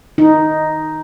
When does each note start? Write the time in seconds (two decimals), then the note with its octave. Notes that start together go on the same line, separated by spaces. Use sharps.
0.18 D#4